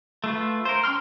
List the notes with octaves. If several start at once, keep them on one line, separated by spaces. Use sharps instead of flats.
A3 F4 B4
A#4 C5
C#4 G5 A#5 C6 F6